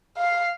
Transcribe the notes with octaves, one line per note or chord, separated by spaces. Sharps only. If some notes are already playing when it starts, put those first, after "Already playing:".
F5